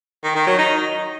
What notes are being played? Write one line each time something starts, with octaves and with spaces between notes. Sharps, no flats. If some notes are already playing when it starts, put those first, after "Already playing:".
D#3
D#3
F#3
D#4